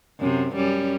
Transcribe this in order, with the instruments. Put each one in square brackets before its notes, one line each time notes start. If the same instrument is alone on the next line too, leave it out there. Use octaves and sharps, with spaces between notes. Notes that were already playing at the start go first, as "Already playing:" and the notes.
[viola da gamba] F#2 C3
F#2 G3 C#4